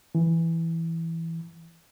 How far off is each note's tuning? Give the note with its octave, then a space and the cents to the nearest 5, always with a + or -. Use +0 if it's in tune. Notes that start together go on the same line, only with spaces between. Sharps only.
E3 +0